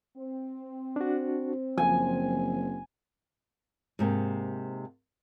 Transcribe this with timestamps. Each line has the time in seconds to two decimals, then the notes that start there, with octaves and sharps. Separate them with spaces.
0.17 C4
0.96 D4 F#4
1.78 F#1 F3 G#5
3.99 G#2 C3 A#3